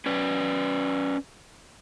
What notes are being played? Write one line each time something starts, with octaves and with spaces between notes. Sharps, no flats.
C#4 B4 D5